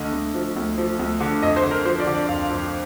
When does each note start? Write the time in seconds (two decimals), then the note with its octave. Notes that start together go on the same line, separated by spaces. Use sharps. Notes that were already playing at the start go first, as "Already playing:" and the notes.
Already playing: D2 D3 D#5
0.12 D2
0.35 F3
0.56 D2
0.78 F3
0.99 D2
1.21 D3
1.42 F2 D#5
1.56 C5
1.64 D3
1.71 A#4
1.85 F3 C5
2.00 D5
2.07 D3
2.15 D5
2.29 F2 F5
2.50 F2